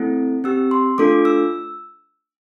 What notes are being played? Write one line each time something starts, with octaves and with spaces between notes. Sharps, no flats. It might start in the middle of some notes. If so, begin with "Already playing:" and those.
Already playing: A3 C4 E4 A4
C4 G4 E6
C6
A3 D4 F4 A4 D6
E6